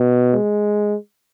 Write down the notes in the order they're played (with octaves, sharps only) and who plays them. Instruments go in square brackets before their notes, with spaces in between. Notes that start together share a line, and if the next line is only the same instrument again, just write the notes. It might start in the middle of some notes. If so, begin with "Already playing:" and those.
Already playing: [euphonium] B2
[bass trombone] G#3